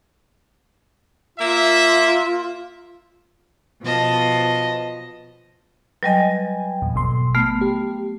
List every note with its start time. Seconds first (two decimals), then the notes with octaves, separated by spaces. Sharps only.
1.38 A#3 F4 E5
3.82 B2 F3 D#5 A5
6.03 F#3 G3 B4 D#5 G5 G#5
6.82 E2 A#2
6.95 G#1 B2 C6
7.35 A3 B3 F6
7.61 G4